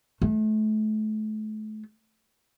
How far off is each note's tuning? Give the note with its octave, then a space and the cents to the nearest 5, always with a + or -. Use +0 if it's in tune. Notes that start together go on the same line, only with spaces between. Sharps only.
A3 -35